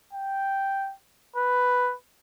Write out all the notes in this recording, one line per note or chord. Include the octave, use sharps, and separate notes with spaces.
G5
B4